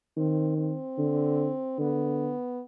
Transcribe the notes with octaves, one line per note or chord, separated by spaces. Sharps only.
D#3 C4
C4
D3
D3 B3